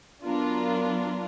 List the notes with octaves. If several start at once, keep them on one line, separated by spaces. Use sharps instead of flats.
F#3 B3 D4 F4 A#4